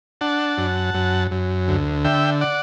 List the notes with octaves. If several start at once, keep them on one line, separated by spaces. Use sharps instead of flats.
D4 F#5 A5
F#2
F#2
F#2
D2
D3 E5 G5
D5 F#5